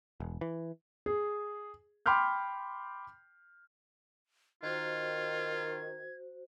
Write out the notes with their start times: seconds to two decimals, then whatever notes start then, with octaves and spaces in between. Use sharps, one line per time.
0.20 E1
0.41 E3
1.06 G#4
2.06 G5 B5 C6 D6 F6 G6
4.63 D#3 F4 F#4 C5 G#6